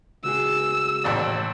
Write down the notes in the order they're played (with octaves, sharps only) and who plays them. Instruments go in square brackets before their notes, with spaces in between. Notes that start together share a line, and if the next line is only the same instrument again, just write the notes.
[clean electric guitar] C#2 F#4 G#4 [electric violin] E6
[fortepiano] A1 D#2 D5